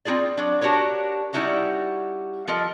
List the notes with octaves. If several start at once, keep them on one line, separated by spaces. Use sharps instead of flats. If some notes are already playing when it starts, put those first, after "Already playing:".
C4 E4 F4 G#4 D5
F#3 D4
D4 F#4 G4 A#4 C#5
G3 C#4 D#4 E4 F#4 G4
F3 F4 A4 A#4 D#5